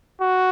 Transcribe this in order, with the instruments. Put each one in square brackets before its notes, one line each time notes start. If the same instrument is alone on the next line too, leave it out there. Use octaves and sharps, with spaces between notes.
[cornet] F#4